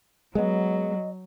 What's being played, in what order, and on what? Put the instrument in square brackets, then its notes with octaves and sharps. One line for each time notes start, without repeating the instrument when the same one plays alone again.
[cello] F#3 [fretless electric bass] G#3 A3 B3 [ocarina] D#5